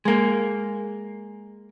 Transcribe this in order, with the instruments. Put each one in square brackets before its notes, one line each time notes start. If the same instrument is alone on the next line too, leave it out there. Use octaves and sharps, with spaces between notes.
[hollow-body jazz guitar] G#3 A#3